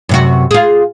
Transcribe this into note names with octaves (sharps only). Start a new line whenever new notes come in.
F#2 C3 F#4
F4 G#4